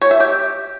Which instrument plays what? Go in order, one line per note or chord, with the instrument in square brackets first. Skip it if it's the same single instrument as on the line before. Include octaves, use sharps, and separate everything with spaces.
[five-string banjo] C#5
E5
G4